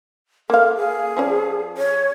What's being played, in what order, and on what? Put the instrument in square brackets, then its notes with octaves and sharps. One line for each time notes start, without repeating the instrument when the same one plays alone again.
[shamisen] A#3 F5 [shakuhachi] A4
[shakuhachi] G#4
[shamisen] F3 C#4 D5
[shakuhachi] C#5